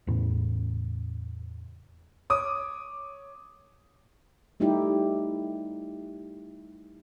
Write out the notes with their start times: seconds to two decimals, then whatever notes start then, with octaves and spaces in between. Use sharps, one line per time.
0.07 E2 A2 C#3
2.30 C#5 D6 D#6
4.60 G3 A3 D#4 E4 G4